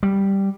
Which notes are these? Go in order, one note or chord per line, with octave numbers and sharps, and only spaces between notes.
G3